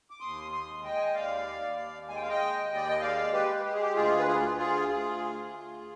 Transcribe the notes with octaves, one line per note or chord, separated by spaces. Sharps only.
D6
D#2 C6 D#6
C6 D#6
G#3
D#5 G5
G#5
G5
D#2 D5 F5
D#2
G#3 G#5
G5
F5
D#5 G5
D#2
D5
D#5
G#3 D5 F5
G4 B4
G#3
G4
G#4
G4
D2 F4 G#4
B4
F4 G#4
D2
F4 G#4
D2 F4 G#4
D2